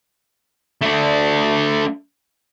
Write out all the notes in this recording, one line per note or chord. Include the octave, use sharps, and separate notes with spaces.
A3 D4